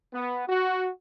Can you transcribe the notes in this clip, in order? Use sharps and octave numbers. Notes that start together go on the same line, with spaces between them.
B3
F#4